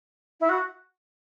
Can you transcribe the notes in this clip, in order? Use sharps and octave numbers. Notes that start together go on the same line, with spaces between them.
E4
F#4